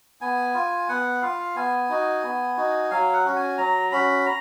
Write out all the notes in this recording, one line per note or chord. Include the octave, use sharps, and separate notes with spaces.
B3 G#5
F4
B3 F#5
F4 F5
B3 G#5
D#4 F#4
B3
D#4 F#4
F#3 F5
F#5
C#4 F#4
G#5
F#3 A#5
C#4 F#4 B5
A#5